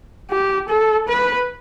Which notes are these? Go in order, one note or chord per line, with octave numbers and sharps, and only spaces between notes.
G4
A4
B4